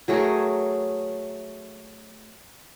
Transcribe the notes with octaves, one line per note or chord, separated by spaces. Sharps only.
F#3 A3 G#4 A#4